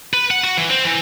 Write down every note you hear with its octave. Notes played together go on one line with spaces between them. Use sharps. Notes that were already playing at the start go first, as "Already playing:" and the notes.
B4
F#5
F#4
E3
C4
E3